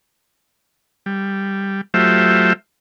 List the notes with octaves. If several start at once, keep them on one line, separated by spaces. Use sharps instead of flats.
G3
F#3 A3 F4 G4 C5 E5